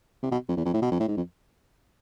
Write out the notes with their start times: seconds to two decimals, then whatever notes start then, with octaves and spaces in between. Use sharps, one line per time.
0.23 C3
0.31 B2
0.48 F2
0.57 E2
0.65 F2
0.74 A2
0.82 B2
0.92 F2
1.00 A2
1.08 G#2
1.17 F2